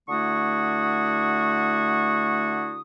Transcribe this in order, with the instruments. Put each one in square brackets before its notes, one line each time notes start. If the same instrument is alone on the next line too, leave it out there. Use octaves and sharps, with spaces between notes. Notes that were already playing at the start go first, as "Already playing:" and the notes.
[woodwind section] D3 A3 E4 F#4 C#6 D#6